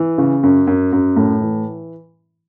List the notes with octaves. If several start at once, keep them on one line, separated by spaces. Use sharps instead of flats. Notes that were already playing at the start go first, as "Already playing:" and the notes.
Already playing: E3
C#3
F#2
F#2
F#2
A2
E3